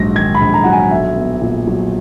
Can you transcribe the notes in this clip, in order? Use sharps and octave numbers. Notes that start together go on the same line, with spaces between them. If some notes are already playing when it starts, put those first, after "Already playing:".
Already playing: A#1 G#2 F#3 A#6
D#3 G#6
B5
A#1
A#5
F#3 F#5
G#5
B1 E5
B3
A#2
F#3